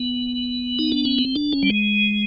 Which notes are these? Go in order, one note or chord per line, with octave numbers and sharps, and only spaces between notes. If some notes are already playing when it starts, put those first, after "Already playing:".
Already playing: B3
D#4
D4
C#4
C4
D4
C#4
G3
G#3